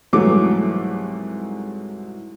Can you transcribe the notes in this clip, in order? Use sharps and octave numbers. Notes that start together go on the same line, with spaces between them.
C2 G#2 E3 F#3 A3 D6